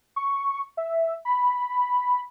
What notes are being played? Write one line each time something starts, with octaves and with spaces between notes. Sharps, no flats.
C#6
E5
B5